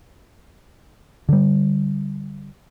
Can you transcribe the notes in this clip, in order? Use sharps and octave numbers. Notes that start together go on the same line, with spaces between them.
D3 G3